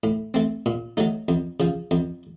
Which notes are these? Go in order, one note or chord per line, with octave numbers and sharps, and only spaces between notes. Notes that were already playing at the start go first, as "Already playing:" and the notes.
A2
A3 C4
A#2
F#3 A3 D#4
F2
C#3 F3
F2